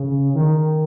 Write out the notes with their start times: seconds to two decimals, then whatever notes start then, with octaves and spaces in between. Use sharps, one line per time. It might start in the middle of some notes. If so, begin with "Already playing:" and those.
Already playing: C#3
0.35 D#3